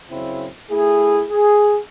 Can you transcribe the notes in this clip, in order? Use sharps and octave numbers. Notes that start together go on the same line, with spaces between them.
F#2 C#3 C4 E4
A3 E4 G#4
G#4